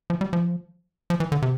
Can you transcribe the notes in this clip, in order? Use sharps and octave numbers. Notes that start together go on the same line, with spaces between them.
F3
G3
F3
F3
E3
D3
C3